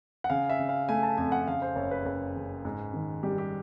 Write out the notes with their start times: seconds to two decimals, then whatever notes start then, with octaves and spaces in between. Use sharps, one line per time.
0.24 F#5
0.30 C#3 F5
0.50 E5
0.59 C#3
0.69 F5
0.89 A3 G#5
1.03 A5
1.17 F2 G#5
1.32 F#5
1.47 C#3 F5
1.62 C5
1.76 F#1 C#5
1.91 B4
2.06 F#1
2.35 C#3
2.65 G#2
2.94 D#3
3.23 G3 G4
3.38 G4